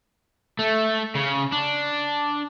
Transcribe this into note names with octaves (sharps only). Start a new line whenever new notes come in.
A3
C#3
D4